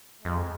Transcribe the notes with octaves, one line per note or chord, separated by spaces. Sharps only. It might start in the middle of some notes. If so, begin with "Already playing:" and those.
F2 G#3